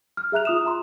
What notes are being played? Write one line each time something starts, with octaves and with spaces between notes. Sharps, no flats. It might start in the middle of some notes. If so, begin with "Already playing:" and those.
F6
G#4 E5 A#5 F#6 F7
F4 D#6 E7
E5 A#5 C6